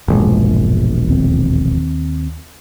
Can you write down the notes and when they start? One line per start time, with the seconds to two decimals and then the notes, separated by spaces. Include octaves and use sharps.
0.08 E1 A#1 G2 G#3
1.09 D#2 C4